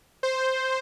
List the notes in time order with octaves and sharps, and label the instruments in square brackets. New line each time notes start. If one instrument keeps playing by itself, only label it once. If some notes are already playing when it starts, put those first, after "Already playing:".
[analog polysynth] C5